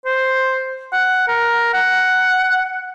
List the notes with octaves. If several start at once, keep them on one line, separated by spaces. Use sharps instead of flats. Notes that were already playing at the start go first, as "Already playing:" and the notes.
C5
F#5
A#4
F#5